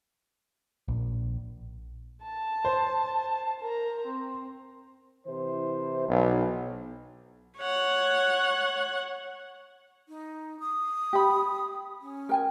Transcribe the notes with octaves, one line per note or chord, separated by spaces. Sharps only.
A#1
A5
C5
A#4 A#5
C4
C3 E3 E4 C5
B1
C#5 F#5
D#4
D#6
G4 B5
C#4
A#4 G5 G#5